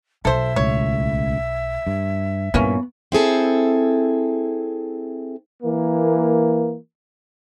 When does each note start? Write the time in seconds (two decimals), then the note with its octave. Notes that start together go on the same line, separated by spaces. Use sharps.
0.25 B1 A4 C5 E5
0.56 C#2 A2 C#5
1.87 G2
2.54 G2 A#2 E3 A#3 B3 C#4
3.12 C4 E4 G#4 A4
5.63 E3 A#3